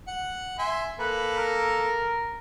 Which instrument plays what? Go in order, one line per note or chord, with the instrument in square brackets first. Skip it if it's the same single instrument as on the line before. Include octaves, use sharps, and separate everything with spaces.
[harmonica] F#5
E5 G#5 C6
[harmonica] A#3 A4 [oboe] B4
[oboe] A#4